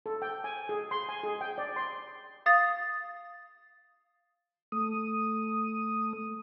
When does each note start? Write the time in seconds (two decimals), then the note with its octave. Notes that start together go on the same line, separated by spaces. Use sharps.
0.06 A4
0.22 G5
0.44 G#5
0.69 G#4
0.91 C6
1.09 G#5
1.23 G#4
1.41 G5
1.58 D5
1.76 C6
2.46 F5 D#6 A6
4.72 A3 D#6